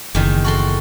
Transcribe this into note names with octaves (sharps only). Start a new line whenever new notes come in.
F#1 E2 D#3
F#4 A4 C6